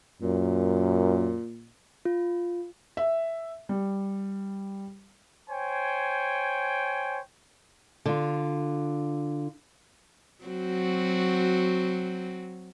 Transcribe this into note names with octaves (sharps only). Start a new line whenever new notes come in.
F#2 A#2
F4
E5
G3
C5 C#5 G5 G#5
D3 F4
F#3 C4 F#4